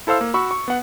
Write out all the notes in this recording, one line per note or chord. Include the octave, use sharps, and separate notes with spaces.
E4 A4 C5 F5 E6
A#3
F#4 B5 C#6 E6
C#6
B3 F#5